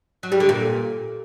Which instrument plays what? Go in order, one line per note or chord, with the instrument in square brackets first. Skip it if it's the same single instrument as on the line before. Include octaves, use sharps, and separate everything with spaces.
[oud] F#3
G3
D3
A#2